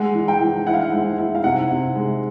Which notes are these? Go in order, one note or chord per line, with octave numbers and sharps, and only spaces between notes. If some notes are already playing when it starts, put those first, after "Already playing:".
Already playing: G#3 F#5
E3
G5
E3
E4 F#5
F5
F#5
G#3
E4
F5
C3 F#5
C3
G#3